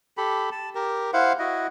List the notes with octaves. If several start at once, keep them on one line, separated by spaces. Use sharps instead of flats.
G4 A4 B5
A5
G4 A#4
E4 C5 F5 F#5
E4 F#4 D#5